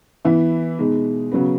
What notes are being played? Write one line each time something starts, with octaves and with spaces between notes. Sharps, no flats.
E3 B3 E4
B2 G#3 D#4
C#3 F#3 B3